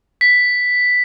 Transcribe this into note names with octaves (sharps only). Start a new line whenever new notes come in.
B6